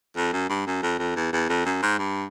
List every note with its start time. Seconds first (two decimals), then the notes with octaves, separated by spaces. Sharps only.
0.17 F2
0.33 F#2
0.49 G2
0.67 F#2
0.83 F2
0.99 F2
1.16 E2
1.33 E2
1.49 F2
1.66 F#2
1.83 G#2
1.99 G2